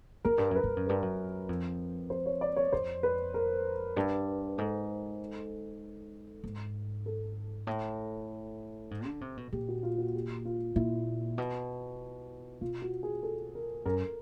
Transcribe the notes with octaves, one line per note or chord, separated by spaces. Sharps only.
F#2 A#4
G2
F#2 B4
G2
F#2
G2 B4
F#2
F2
C5
C#5
D5
C#5
F2 C5
B4
A#4
G2
G#2 A4
G#2
A4
A2
G#2
D3
C3
B2
A#2 G4
F#4
F4
F#4
G4
F4
A#2 E4
B2
B2 F4
F#4
G#4
A4
A#4
F#2 A#4